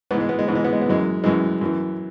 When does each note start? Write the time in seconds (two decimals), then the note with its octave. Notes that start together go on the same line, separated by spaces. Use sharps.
0.11 G#2 B3
0.13 E3
0.20 G#3
0.29 B3
0.39 G#3
0.48 G#2 E3 B3
0.55 G#3
0.64 B3
0.73 G#3
0.81 B3
0.86 F#2 E3 G#3
1.24 F#2 E3 G#3
1.61 F#2 E3